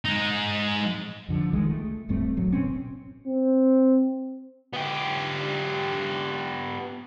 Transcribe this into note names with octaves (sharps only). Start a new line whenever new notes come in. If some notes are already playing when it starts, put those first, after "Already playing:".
G#3 D#4
F2 D3 F3
C2 D#3 G#3
A3
D1 G2 A3 C4
D1 A1 F#3
F#1 B2 C4 C#4
C4
B3 G4